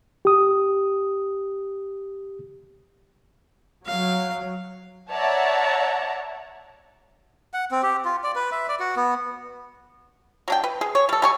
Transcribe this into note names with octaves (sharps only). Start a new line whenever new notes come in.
G4 D#6
F#3 F5
C#5 D5 E5 F#5 A5 A#5
F#5
C4
G4
F4
D5
B4
E5
D5
F#4
B3
F#3 D4 G5
B4
G#4
C#5
G3 A4
G3 G#5 C#6